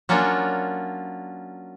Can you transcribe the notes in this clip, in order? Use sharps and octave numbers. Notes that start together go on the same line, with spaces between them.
F#3 A#3 C#4 D4 F4